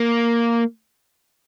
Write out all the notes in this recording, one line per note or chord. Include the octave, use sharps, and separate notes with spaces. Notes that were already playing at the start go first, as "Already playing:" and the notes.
Already playing: A#3